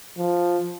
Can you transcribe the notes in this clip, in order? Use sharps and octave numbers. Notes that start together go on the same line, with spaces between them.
F3